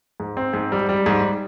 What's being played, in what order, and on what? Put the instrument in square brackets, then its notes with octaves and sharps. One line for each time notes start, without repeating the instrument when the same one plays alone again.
[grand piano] G#2
C4
G#2
G3
G3
G#2